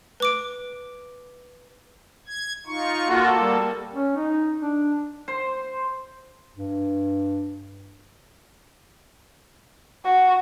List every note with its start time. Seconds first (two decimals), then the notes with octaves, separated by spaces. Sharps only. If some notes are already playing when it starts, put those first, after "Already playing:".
0.20 B4 D6 D7
2.28 G#6
2.67 D#4 F4 C#6
3.08 A#3 F4 F#4 A4
3.40 G3
3.93 C#4
4.17 D#4
4.61 D4
5.28 C5
6.56 G2
10.05 F#4